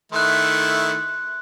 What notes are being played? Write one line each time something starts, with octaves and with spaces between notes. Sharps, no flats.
D#3 A3 E4 C6 F#6